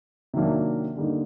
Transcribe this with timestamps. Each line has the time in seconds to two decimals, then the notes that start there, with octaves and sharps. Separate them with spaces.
0.34 C3 D#3 F#3 A#3 D4
0.96 D3 G3 A#3 D#4